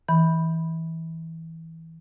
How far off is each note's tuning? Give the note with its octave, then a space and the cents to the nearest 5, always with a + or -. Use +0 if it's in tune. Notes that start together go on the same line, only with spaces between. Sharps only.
E3 -20 B5 +0